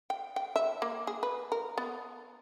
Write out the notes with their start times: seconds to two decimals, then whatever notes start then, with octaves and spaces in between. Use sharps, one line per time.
0.10 G5
0.36 G5
0.56 E5
0.82 A#3
1.07 G#4
1.23 B4
1.52 A#4
1.78 B3